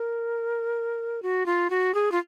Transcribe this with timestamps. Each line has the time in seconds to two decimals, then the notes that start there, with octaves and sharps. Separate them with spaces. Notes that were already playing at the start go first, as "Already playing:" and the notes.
Already playing: A#4
1.22 F#4
1.46 F4
1.70 F#4
1.94 G#4
2.12 F4